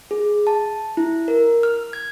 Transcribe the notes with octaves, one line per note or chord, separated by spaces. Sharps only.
G#4
A5
E4
A#4
F6
G#6